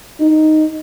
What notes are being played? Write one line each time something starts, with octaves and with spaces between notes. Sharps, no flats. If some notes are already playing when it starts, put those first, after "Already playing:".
D#4